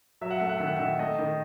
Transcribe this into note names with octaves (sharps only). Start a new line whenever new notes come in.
F#3 E5
F#5
A3 E5
F#5
D#3 E5
F#5
D#3 E5
A3 D#5
D#3